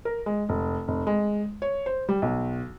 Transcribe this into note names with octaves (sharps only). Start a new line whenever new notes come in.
A#4
G#3
F1
F1
G#3
C#5
C5
G3
B1